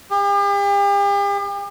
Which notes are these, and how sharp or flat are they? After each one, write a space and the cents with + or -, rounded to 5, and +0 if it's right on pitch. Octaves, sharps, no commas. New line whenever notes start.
G4 +45